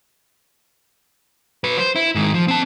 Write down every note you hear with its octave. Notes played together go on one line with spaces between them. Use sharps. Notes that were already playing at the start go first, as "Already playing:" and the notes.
F#3 B4
C5
E4
G#2 D#3
F3
C4 A5